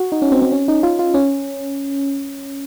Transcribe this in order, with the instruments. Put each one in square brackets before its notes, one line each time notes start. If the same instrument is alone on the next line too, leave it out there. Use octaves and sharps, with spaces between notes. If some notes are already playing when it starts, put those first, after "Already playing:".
Already playing: [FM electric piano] F#4
D#4
C#4
C4
C4
C#4
D#4
F4
F4
C#4